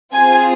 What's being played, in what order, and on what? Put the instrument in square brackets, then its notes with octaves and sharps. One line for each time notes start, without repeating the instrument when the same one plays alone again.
[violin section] C4 F4 G#4 G#5